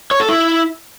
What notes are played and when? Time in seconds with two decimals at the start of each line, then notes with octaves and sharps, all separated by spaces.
0.11 C#5
0.20 A4
0.29 E4